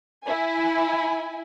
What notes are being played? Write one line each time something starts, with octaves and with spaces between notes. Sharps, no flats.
E4 G#5